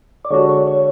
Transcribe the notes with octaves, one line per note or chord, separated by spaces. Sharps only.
D5
D3 G#3 D4 F#4 A4 C#5
C#5
C#5